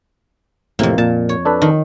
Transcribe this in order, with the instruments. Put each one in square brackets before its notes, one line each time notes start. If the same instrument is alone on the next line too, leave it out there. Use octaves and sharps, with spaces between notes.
[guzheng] F2 A#3 [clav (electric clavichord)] A2 C3
[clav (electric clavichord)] A#2 [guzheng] A5
[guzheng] C#5
[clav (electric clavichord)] D4 A4 B4
[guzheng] D#3